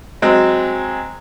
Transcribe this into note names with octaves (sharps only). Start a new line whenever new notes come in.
F#3 G#3 C4